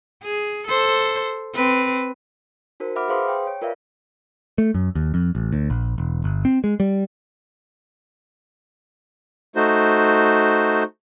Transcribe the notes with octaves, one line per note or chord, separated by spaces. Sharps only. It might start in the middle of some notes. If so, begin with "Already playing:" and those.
G#4
A4 C5
C4 B4
D#4 F#4 A#4 C5
E5 F#5 B5 D6 F6
G#4 B4 C5 F5 C6 D#6
G5
C#5
F4 A#4 B4 D5 E5 F5
A3
F#2
D#2
F2
A1
D2
A#1
E1
G1
C4
G#3
G3
A3 D#4 F#4 C5